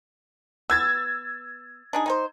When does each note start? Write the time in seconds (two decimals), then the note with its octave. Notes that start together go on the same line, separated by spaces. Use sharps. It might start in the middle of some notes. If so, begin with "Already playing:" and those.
0.70 B3 E6 G#6 A6
1.93 D4 D#4 G#4
2.06 D#4 G#4 C5